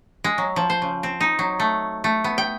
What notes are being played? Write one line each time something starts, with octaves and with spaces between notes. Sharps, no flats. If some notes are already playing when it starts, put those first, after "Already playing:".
G#3
F#3
F3
C5
C#3
C4
D#4
F#3
A3
A3
B3
G5